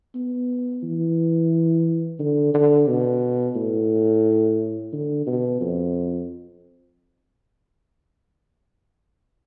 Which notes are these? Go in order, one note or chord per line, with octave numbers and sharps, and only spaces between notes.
B3
E3
D3
D3
B2
A2
D3
B2
F2